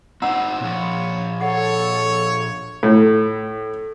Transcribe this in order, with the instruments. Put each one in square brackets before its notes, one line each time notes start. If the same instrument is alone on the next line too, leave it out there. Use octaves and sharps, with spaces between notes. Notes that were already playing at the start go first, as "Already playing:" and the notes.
[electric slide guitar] C4 D#4 [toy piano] F#5 A#5 E6
[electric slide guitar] A#2 F3 [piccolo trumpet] C#5
[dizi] A4 [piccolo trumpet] C#5 [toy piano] F#5
[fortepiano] A2